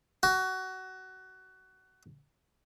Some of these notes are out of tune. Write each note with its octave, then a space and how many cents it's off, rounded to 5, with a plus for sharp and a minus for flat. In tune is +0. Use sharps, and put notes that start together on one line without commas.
F#4 +20